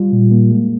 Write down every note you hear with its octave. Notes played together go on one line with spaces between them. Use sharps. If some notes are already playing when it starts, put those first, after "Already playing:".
Already playing: G3 F4
A#2
A#3
G#3